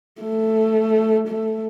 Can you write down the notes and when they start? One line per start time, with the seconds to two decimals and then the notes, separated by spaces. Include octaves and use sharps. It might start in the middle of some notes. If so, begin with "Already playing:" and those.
0.21 A3
1.28 A3